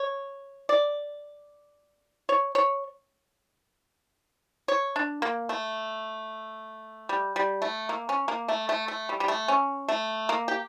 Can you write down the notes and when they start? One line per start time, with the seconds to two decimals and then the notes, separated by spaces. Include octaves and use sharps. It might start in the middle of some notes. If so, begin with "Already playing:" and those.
Already playing: C#5
0.69 D5
2.29 C#5
2.55 C#5
4.68 C#5
4.96 D4
5.22 A#3
5.49 A3
7.09 G3
7.36 G3
7.62 A3
7.89 A#3
8.09 C#4
8.28 A#3
8.48 A3
8.69 A3
8.88 A3
9.09 G3
9.20 G3
9.28 A3
9.48 C#4
9.88 A3
10.29 A#3
10.48 G4